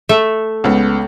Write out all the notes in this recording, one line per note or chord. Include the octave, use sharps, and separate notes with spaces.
A3 E5
C#2 B3